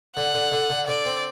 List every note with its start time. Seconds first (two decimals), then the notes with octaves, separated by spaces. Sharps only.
0.16 D3 F#5
0.34 D3
0.52 D3
0.70 D3
0.87 D3 D5
1.05 C4